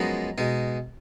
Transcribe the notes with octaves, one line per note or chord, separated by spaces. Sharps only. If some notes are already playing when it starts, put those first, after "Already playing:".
Already playing: F#2 F3 G#3 B3 D#4 A#5
B2 G#3 D#4